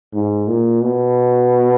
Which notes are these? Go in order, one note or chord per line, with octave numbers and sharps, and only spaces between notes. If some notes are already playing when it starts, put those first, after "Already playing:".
G#2
A#2
B2